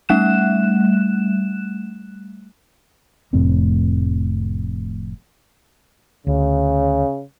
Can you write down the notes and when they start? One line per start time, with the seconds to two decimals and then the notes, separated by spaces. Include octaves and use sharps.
0.09 G3 A3 F#6 E7
3.33 F1 F2 A2 C4
6.27 D2 C#3